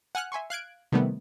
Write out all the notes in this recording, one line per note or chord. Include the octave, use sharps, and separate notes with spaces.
F#5 G#5 F6 F#6
E5 G#5 C6 C#6
F5 F#6 G#6 D7
C3 D#3 G3 A3 B3